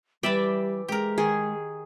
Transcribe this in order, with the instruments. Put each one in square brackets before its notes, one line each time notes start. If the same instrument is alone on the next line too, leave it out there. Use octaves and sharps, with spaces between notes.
[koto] E3 G5 [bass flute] G3 [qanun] D5 E5
[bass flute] G#3 [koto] G4 A#4
[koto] D#3 [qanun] G#4